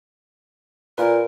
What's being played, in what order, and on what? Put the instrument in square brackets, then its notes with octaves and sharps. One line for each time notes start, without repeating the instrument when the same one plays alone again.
[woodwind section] A#2 [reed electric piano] F4 B4 [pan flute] A#4